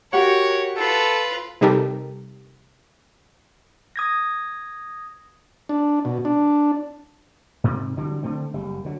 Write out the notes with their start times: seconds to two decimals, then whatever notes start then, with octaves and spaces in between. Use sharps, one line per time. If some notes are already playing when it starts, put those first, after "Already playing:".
0.13 F#4 G4 A#4 C#5 F#5
0.77 F4 A4 B4
1.61 C3 G3 D#4 G4 A4 A#4
3.96 D#6 G#6 A#6
5.69 D4
6.05 B2
6.25 D4
7.64 G#2 C3 D#3
7.97 D3 E3 F#3 G3
8.23 D3 A3 C4
8.53 F#1 G3
8.85 D3 F#3